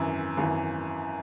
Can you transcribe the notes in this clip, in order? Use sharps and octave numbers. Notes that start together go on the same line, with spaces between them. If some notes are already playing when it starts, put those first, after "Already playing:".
Already playing: G#1 F#2 E3
G#1 F#2 E3